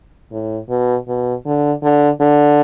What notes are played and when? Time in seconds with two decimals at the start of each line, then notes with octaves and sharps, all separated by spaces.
0.32 A2
0.69 B2
1.08 B2
1.46 D3
1.83 D3
2.21 D3